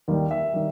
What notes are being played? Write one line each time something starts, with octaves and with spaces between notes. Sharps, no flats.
D#2 D#3 G3
E5
D#3 G3